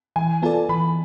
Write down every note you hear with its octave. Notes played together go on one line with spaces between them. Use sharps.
E3 G#5
B3 F4 A4 D5 A5
E3 B5